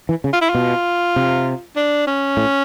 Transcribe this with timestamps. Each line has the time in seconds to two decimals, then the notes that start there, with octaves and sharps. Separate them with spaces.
0.09 E3
0.24 C#3
0.33 F4
0.41 E4
0.50 B2 F4
1.16 C3
1.76 D4
2.07 C#4
2.37 A2